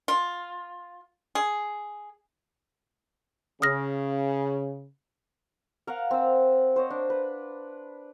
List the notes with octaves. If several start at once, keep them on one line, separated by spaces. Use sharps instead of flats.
F4
G#4
C#3 D#6 F6 A#6
A#4 F5 F#5
C4 E6
C5 C#5 D#5
D4
B4